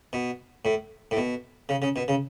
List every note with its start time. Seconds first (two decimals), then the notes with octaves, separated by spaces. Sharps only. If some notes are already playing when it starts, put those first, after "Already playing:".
0.13 B2
0.65 A2
1.11 A2
1.17 B2
1.69 C#3
1.82 C#3
1.96 B2
2.08 C#3